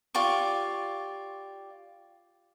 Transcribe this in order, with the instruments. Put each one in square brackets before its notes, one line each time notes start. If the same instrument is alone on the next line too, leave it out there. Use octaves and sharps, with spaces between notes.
[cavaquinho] F4 G4 D5 C#6